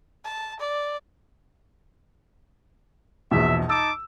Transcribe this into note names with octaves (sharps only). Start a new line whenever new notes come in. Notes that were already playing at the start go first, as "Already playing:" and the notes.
A5
D5
A#1 E2 B2 E5
D#4 A5 D6 E6